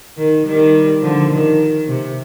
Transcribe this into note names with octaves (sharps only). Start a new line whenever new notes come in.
D#3
D#3 G3
D3 F3
D#3
C3